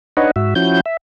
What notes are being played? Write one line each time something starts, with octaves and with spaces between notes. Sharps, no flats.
D4 D#4 B4 C#5 D#5 F#5
G#2 F#4 E5
F3 C#4 E4 F#4 G6
E5